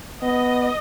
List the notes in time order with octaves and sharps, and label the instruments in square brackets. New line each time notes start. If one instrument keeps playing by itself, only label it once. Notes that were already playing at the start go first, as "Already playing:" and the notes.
[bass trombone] B3 [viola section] D#5